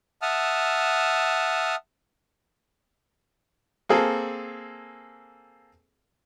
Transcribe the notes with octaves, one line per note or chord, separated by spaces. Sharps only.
E5 F#5 A5 D#6 F6
A#3 C4 G#4 A4